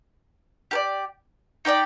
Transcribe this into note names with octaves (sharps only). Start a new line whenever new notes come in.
G4 A#4 D5
D#4 G4 D5 G5